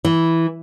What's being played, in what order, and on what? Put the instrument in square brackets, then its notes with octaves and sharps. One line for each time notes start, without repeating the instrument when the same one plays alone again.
[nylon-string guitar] E3